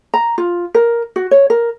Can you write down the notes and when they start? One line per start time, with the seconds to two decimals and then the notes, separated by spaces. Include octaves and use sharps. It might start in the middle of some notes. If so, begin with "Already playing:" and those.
0.14 A#5
0.38 F4
0.74 A#4
1.16 F#4
1.31 C#5
1.50 A#4